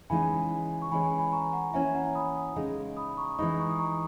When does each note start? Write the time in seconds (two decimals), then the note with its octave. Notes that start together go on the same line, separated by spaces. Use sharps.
0.10 C#3 E3 G#3 D#4 G#5 B5
0.82 C#6
0.91 E3 G#3 C#4 G#5 B5
1.19 G#5 B5
1.33 A#5 C#6
1.53 F#5 A#5
1.74 E3 A#3 C#4 E4 E5 G#5
1.95 F#5 A#5
2.15 B5 D#6
2.56 C#3 G#3 D#4
2.97 B5 D#6
3.10 B5
3.17 A#5 C#6
3.38 E3 G#3 D#4 B5 D#6
3.59 A#5 C#6
3.70 D#6
3.79 A#5 C#6